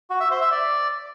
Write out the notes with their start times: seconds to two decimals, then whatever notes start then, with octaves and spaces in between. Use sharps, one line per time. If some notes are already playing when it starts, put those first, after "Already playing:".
0.10 F#4
0.20 E5
0.31 C5
0.41 E5
0.51 D5